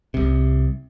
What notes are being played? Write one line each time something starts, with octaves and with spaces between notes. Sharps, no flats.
C2 C3